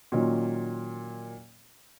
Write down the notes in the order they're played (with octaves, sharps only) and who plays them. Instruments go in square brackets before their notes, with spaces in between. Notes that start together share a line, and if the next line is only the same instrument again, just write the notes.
[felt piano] A#2 D#3 F#3 C#4 F4